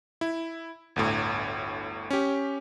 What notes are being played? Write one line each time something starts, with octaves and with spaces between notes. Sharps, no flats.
E4
G1 D2 A2
C#4 G4